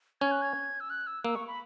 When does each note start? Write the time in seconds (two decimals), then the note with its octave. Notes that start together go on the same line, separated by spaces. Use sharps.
0.21 C#4 G#6
0.31 F#6
0.42 G#6
0.80 E6
0.90 F#6
1.07 E6
1.24 A#3 E6
1.35 C#6
1.47 B5